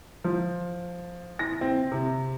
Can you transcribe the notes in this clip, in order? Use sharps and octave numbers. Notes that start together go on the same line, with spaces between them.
F3
A#6
C4
C3